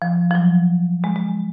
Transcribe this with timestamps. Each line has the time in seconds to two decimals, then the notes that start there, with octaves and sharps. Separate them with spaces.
0.02 F3
0.31 F3
0.35 F#3
1.04 G#3
1.16 G#3